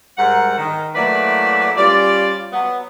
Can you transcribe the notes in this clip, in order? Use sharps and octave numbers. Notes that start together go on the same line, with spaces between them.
G#2 G3 A#4 F#5
D#3
F#3 A3 A#3 E4 B4 D5
G3 C#4 F4 D5
F#3 B3